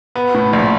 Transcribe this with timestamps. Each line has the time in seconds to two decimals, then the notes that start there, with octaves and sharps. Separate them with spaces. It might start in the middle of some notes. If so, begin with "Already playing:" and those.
0.16 B3
0.34 A2
0.53 A#1